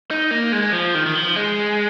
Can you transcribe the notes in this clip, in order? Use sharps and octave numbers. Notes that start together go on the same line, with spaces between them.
D#4
A#3
G#3
F3
D#3
D#3
F3
G#3